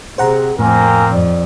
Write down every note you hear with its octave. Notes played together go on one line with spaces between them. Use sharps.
C3 G#4 C5 F#5 A#5
F2 A2 A#3 C4 A#4 G#5
F2 D5